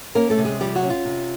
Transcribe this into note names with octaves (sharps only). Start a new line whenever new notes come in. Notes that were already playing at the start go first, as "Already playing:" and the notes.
A#3 C#4 A#4
A3 A4
C3
G#3 G#4
F3 G3 G4
F#3 F#4
C#4
F4
C3